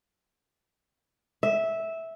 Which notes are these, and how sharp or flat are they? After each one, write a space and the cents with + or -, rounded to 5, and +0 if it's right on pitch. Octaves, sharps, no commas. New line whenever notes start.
E5 -10